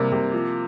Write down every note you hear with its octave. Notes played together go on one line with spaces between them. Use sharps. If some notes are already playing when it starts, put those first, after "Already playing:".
Already playing: C3 G3 A#3
C3
F3